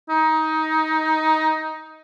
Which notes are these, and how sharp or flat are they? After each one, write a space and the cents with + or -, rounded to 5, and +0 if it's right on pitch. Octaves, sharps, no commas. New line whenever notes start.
D#4 +15